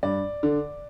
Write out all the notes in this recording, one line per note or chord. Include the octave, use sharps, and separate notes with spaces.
G2 D5
D3